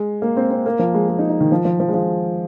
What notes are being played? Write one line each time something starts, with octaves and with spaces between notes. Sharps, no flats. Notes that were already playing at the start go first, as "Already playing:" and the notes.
Already playing: G#3
A#3
C4
C4
A#3
F3
G#3
G#3
D#4
D#4
D#3
F3
F3
F3
G#3
F3